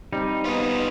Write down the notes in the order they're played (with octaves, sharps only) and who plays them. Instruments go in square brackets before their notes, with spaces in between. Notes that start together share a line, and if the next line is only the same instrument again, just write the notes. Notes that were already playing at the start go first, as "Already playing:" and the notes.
[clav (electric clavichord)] G3 [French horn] C4 [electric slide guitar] D#4
[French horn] B3 [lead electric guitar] F4 G#4